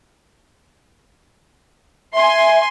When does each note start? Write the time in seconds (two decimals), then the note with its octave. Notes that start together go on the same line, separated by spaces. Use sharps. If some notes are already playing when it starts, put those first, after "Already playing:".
2.14 E5 G#5 C6